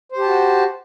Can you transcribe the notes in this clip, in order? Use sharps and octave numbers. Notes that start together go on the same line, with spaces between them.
F#4 G4 C5 A5